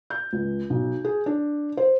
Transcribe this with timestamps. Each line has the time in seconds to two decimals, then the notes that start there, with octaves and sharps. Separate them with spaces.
0.10 G6
0.33 C#2
0.70 B1
1.04 G#4
1.26 D4
1.77 C5